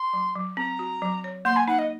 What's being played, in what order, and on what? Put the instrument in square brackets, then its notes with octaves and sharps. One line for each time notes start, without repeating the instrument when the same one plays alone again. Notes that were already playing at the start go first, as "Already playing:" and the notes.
Already playing: [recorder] C6
[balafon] F#3
F#3
[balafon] C4 [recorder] A#5
[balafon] F#4
F#3
C#5
[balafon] A#3 [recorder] C6
[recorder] G#5
[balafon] D#4 [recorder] F#5
[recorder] D#5